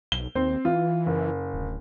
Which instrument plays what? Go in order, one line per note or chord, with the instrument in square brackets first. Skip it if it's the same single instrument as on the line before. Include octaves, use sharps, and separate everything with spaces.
[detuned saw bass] B1 [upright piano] G7
[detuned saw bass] D#2 [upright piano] C4
[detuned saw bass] E3 [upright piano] F4
[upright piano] F#1
[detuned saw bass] D1